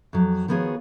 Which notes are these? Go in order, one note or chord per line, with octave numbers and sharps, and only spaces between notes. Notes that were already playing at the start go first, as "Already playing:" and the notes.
F2 F#3
D#3 F3 B3 F#4 G#4 C#5